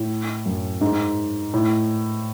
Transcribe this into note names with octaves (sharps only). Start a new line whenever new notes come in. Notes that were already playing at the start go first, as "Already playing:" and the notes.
Already playing: A2
F#2
G#2
A2